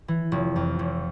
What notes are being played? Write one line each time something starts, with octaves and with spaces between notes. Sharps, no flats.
E3
F1
F2
F1